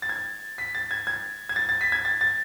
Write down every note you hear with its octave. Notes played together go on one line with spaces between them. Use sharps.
A6
G#6
B6
A6
G#6
G#6
G#6
A6
A6
B6
G#6
A6
A6